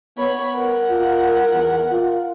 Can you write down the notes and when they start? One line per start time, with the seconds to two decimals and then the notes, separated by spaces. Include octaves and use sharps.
0.18 B3 C#5 B5
0.55 A#4 F#5
0.90 F4
1.53 E2
1.92 F4